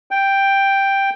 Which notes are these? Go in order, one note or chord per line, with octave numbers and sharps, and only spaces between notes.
G5